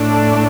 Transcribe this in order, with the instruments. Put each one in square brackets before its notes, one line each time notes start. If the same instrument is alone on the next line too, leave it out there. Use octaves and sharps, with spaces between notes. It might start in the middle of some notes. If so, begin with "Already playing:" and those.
Already playing: [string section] A2 A3 D4